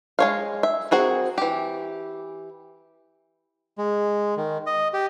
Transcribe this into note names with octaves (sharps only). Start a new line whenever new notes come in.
G#3 C#5 F5
E5
C4 F#4 G#4 A#4
E3 G4
G#3
D#3
D#5
G4